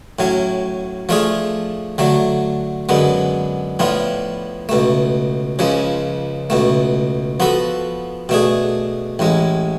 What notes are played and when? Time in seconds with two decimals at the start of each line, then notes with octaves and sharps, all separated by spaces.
0.19 A2 F#3 C#4
1.09 F3 A3 D4 F4 G#4
1.98 D3 F#3 A3
2.89 F#2 D3 G#3 B3
3.79 A2 F3 B3 D4 F4
4.69 C#2 B2 A3
5.59 C#2 C#3 F3 G#3
6.50 C#2 B2 A3
7.40 F3 B3 F#4 A4
8.29 B2 A3 D4 G#4
9.19 A1 A2 G#3